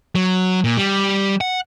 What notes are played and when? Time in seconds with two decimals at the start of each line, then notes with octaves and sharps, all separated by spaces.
0.15 F#3
0.64 A#2
0.77 G3
1.41 F#5